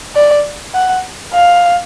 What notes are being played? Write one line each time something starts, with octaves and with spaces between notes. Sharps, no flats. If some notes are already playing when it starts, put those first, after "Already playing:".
D5
F#5
F5